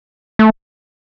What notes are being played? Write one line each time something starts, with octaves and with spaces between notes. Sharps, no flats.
A3